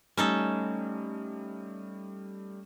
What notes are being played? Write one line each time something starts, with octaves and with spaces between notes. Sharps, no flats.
G3 A3 C#4 D#4 A4